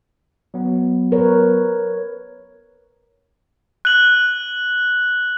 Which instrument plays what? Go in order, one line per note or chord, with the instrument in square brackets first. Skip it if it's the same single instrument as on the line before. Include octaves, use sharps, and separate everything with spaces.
[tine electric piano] F#3 B3
[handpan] A#4 B4 C#5
[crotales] F#6 F#7